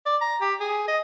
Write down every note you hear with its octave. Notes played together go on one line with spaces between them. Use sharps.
D5
A#5
G4
G#4
D#5